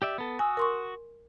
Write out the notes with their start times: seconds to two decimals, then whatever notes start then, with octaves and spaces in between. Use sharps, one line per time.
0.02 G4 D5 E5
0.18 B3 A4
0.39 F#4 G#5 D#6 E6
0.57 A#4 C6 C#6